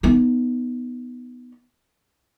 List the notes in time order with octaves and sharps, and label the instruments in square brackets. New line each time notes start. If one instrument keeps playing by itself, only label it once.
[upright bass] B3 D#4